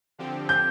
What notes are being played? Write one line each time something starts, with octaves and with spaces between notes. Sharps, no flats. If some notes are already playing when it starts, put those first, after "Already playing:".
D3 F3 C4 G4
G6